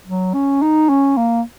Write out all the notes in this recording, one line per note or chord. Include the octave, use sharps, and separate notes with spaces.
F#3
C#4
D#4
C#4
A#3